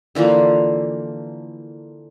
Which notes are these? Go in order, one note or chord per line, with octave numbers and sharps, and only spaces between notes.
D3 E3 F3 A#3